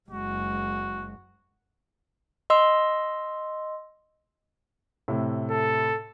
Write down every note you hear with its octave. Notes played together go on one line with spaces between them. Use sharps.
F#1 G#3 F#4
D#5 C6 E6
A2 C3
A4